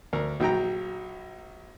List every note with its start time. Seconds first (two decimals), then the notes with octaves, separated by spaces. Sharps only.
0.13 D2 A#4
0.40 A#1 F#3 G5 A#5